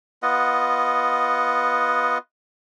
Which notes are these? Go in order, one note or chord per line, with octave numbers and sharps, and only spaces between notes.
B3 F4 D#5 F#5